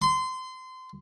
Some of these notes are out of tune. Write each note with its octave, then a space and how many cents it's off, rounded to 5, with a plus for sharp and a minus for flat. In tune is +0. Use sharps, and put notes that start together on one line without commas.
C6 -25